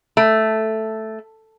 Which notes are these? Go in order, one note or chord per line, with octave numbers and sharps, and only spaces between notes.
A3